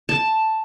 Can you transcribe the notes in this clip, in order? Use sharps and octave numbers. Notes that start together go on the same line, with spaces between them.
A5